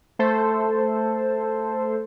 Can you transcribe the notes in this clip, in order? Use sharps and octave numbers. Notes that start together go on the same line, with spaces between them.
A3 A4 C5